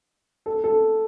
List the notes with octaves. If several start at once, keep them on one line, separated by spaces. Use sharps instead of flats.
A4
A4